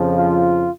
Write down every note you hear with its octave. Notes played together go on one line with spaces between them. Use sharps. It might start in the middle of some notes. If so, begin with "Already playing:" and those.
Already playing: F2 C#3 F3
F4